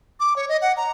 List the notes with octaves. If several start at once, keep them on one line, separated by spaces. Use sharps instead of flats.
D6
C#5
D#5
F#5
A#5